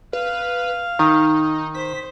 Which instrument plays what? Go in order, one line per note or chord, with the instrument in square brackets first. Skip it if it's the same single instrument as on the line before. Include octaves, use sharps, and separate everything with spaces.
[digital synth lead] B4 [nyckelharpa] F5
[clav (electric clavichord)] D#3 [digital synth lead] D#4
[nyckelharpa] C5 [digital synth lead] B6